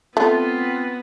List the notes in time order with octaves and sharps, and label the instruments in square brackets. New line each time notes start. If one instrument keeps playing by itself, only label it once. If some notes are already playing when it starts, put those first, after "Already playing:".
[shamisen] A3 [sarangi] B3 [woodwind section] C4 F4